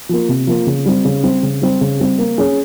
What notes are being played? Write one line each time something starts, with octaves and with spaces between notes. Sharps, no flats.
F3 A#3
C3
F3 A#3
C#3
G3 C4
C#3
G3 C4
C#3
G3 C4
C#3
G3 C4
A#3
C#4 G#4